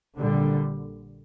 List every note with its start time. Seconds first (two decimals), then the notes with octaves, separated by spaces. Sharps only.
0.18 A#1 A#2 D3 G3